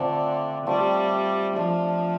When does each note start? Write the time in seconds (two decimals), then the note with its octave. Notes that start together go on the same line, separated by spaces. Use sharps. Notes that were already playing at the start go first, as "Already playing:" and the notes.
Already playing: D3 A3 C4 F4 D5
0.66 G3 A3 C4 F4 D5
1.56 F3 A3 D4 A4